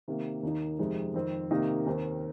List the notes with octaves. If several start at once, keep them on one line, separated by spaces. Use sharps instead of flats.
C3 D#3 A#3
D#2 D#3 A#3 D#4
F2 C3 G#3 D#4
F2 D#3 C4
C3 D#3 A#3 D#4
D#2 D#3 C4